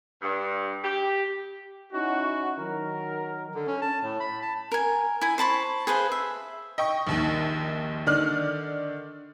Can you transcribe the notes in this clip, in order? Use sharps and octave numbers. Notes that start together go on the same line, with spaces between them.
G2
G4
C#4 D#4 E4 F#4
D#3 F#3 A#4
D3
C#4
A5
A2
B5
A5
A#4 G#5
E4 G#5
C5 A5 B5 C#6
G#4 B4 C5 F5
E5
D#5 G5 C#6
A#1 D#2 D#3
D3 D#3 D5 F6 F#6